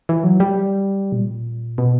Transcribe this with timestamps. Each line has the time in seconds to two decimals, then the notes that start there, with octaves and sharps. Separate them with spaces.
0.09 E3
0.24 F#3
0.40 G3
1.12 B2
1.17 A#2
1.78 B2